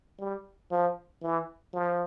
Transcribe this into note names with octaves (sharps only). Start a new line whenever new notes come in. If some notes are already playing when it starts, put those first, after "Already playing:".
G3
F3
E3
F3